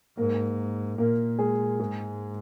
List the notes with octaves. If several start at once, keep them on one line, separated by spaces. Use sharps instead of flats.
G#2 A#3 A#4
A#2 A#3 A#4
G#3 G#4
G#2 G#3 G#4